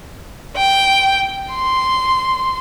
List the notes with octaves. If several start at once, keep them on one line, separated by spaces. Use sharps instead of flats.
G5
C6